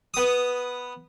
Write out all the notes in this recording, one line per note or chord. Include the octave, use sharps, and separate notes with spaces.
B3 D#6